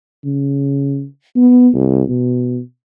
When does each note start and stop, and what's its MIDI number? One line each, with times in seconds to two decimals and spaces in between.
0.25 1.05 49
1.36 1.69 59
1.74 2.03 36
2.08 2.60 47